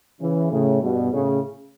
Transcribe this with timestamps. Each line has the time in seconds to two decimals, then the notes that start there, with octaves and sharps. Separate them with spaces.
0.21 C#3 E3
0.52 A2 C#3
0.81 G2 B2
1.12 A2 C#3